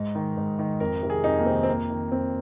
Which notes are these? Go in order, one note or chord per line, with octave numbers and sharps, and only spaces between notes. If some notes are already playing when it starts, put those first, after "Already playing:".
Already playing: G#2 D#4
D#3
G#2
D#3
F2 A#4
C3 D#3
G#4
F2 D#4
A#3
C3 D#3 C4
C4
F2 A#3
D#3
F2 C4